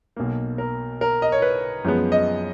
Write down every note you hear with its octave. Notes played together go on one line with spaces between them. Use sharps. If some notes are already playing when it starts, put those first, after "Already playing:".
B1 B2 A#3
A#4
A#4
D#5
C#5
B4
F#2 F3 G#3 B3
D#5